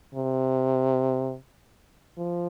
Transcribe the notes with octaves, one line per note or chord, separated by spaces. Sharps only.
C3
F3